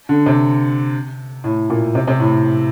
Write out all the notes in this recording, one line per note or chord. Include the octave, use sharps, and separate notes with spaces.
D3
C3
A2
A#2
C3
C3
A2